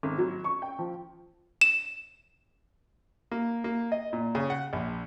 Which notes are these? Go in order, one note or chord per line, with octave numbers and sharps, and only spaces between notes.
G#1
F#3
C#6
G5
F3
E7
A#3
A#3
D#5
A#2
C#3
F#5
A#1